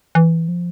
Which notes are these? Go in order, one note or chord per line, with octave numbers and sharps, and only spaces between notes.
E3
F3